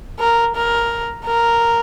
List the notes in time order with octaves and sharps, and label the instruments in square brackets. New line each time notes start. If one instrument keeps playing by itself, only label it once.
[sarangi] A#4
A#4
A#4